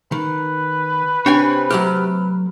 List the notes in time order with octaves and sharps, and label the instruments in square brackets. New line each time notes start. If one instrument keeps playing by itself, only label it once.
[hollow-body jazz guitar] D#3 [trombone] B4
[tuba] C3 [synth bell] D4 [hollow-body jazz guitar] C#5 G5 G#5
[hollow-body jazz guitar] F#3 A3 G4 [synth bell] F6